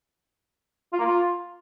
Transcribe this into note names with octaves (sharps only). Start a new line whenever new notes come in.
F4
A#3
F4